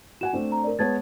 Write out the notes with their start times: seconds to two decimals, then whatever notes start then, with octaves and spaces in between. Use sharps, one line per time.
0.21 F#4 F#5 G#5 E7
0.33 A3 C4 D4
0.52 A#5
0.64 A#4 D5
0.79 G#3 B3 C#5 A5 G#6 A6